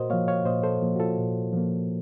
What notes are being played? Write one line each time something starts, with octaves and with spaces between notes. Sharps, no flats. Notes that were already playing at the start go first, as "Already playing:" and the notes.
Already playing: A#2 F#4 A#4 C5 D#5
F3 A#3 C#5 F5
C#5 F5
A#2 C5 D#5
A4 C5
F3 A#3
F#4
F4 A4
A#2
F3 A#3